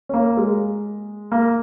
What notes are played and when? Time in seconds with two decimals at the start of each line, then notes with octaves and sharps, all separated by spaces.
0.09 C#4
0.14 A#3
0.37 G#3
1.32 A#3